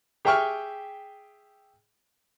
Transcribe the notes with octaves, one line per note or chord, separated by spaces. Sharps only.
G4 G#4 E5 G5 C#6 F6